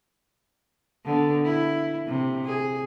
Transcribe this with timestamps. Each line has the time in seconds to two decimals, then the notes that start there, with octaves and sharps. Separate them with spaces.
1.05 D3 B3
1.45 E4
2.07 C3
2.45 G#4